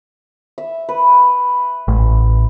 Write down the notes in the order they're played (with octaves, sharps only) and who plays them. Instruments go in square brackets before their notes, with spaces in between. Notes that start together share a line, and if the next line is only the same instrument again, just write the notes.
[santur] E5
B4
[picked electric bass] A1